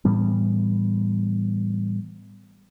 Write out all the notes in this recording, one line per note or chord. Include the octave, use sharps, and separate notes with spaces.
A2 E3 G3 B3